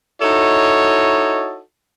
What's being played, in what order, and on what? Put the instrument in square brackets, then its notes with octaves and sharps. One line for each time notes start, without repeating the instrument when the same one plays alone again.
[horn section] D#4 E4 F#4 A4 C#5 D#5